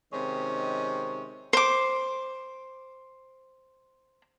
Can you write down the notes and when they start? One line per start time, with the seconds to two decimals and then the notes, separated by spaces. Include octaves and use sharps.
0.12 C3 D#3 G#3 C#4
1.53 C5 D6